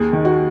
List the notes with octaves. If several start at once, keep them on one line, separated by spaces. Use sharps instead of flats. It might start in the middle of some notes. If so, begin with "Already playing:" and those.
Already playing: D#2 G#4
D#3
F#4